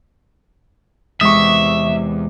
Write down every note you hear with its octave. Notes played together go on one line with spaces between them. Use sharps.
E2 C3 G#3 E5 C#6 D#6